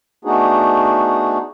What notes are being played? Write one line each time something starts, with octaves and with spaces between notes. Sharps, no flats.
A3 B3 D4 D#4 F#4 G#4